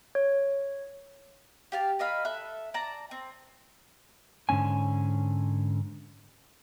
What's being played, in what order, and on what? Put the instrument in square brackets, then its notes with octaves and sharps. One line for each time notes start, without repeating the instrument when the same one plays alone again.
[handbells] C#5
[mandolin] G4 F5 A5
A#4 D#5 F5 B5
A4 E5 F#6
D5 A5 A#5
C4
[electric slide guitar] G#2 D3 C#4 G#5